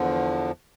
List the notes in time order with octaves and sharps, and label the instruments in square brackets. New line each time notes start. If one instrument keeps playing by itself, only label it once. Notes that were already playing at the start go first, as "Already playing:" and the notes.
Already playing: [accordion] E2 D3 F3